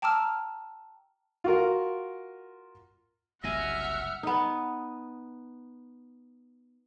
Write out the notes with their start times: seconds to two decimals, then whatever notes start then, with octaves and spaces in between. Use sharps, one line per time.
0.02 G5 A5 A#5 D6 E6 F6
1.44 F4 F#4 A#4
3.44 F#1 C2 F#2 D#5 E5 F#5 G#5 F6
4.23 B3 D#4